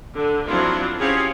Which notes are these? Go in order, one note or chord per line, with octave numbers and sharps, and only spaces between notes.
D3
F3 F#3 C4 D4 E4 F4
C4 C#4 G4 G#4 C#5 F5